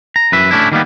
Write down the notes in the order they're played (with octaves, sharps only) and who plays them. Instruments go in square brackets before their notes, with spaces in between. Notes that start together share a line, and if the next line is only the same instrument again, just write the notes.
[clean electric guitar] A#5
F#2 B4 E5
A3 C#4 D4 E4
D#3 G3 A#3 B3